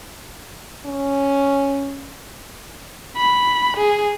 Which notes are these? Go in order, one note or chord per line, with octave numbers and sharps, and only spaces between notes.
C#4
B5
G#4